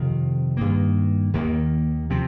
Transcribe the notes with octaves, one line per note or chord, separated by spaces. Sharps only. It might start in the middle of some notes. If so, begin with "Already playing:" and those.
Already playing: F2 C3 D#3 C4
G2 D#3 A#3
D#2 D#3 A#3
C3 F3 C4